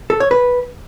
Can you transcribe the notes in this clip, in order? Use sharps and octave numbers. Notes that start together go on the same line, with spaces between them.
A4
C#5
B4